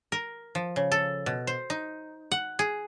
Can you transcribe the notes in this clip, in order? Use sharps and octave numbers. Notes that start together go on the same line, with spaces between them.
A#4
F3
C#3
A4
B2
C5
D#4
F#5
G#4